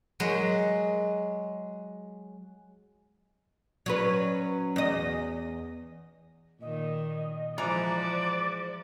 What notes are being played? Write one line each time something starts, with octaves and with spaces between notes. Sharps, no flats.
F#3 G#3
F#3 C#4 B4
E2 D#5
A#2 D#3 D#5
E3 F3 G#3 F#4 C5 D5 A#5